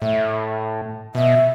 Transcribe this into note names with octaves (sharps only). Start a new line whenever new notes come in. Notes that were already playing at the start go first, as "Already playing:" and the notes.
A2 E5
B2 E5